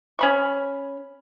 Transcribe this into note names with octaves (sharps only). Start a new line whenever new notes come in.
C#4 B5 C#6